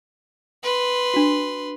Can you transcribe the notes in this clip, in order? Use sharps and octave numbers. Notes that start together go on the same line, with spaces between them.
B4 C6
D4 F#4